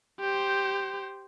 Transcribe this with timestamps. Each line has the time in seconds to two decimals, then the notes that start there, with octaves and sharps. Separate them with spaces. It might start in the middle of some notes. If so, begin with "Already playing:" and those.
0.20 G4 C5